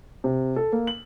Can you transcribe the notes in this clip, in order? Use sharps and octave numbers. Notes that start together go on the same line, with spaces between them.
C3
A4
A#3
F#7